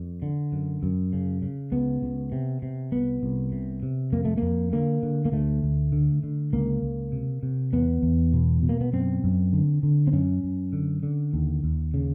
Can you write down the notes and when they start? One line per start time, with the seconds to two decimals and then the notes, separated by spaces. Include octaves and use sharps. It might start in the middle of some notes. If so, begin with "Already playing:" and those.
Already playing: F2
0.22 D3
0.53 F#2
0.83 F#2
1.13 C#3
1.42 C#3
1.72 C#2 B3
2.02 C#2
2.32 C3
2.62 C3
2.92 C2 B3
3.23 C2
3.52 C3
3.83 C3
4.12 F2 A#3
4.25 A3
4.37 F2 A#3
4.72 D3 A#3
5.03 D3
5.25 A#3
5.32 D2 A3
5.63 D2
5.92 D3
6.23 D3
6.53 C#2 A#3
6.83 C#2
7.12 C3
7.43 C3
7.73 E2 B3
8.02 E2
8.33 B2
8.63 B2
8.69 A#3
8.81 B3
8.93 F#2 C4
9.24 F#2
9.53 D3
9.83 D3
10.07 C4
10.13 F#2 C#4
10.44 F#2
10.73 D3
11.03 D3
11.33 D#2
11.64 D#2
11.94 C#3